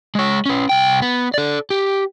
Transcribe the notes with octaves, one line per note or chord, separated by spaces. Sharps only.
G#3 C#5
C#4 B4
C2 G5
B3
A4 D5
G4